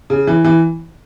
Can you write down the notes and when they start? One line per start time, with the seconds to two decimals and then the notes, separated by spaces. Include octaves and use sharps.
0.10 C#3
0.27 E3
0.44 E3